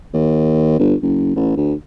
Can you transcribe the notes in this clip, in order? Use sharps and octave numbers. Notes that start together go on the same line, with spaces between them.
D#2
G1
F#1
A1
D2